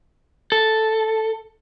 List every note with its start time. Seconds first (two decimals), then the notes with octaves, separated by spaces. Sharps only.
0.52 A4